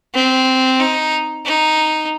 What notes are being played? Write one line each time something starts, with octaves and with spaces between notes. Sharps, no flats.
C4
D#4
D#4